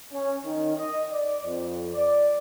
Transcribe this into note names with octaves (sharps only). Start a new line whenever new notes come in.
C#4
D#3
D#5
D5
F2
D5